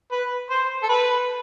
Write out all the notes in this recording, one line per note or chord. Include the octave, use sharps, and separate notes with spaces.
B4
C5
A4
B4